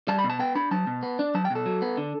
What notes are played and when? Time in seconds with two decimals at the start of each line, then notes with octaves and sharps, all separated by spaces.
0.08 G3 A5
0.19 B5
0.24 B2
0.30 A5
0.39 B3 G5
0.55 D4 B5
0.71 F#3 A5
0.87 B2
1.03 B3
1.19 D4
1.34 F#3 A5
1.45 G5
1.50 B2
1.55 A4
1.66 F#3
1.82 B3
1.97 D3